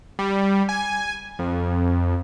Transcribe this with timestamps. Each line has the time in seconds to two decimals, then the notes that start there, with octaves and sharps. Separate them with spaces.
0.19 G3
0.69 G#5
1.39 F2